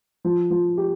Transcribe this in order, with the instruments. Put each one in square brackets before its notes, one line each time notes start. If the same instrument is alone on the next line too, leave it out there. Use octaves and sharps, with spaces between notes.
[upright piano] F3
F3
G4